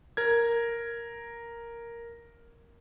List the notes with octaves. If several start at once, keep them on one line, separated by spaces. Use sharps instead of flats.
A#4 G#6